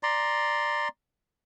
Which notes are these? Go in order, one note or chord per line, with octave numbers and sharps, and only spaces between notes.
D5 A#5 C6